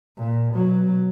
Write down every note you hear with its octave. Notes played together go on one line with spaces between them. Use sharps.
A#2
B2 F#3